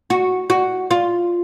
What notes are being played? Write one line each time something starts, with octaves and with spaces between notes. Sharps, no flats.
F#4
F#4
F4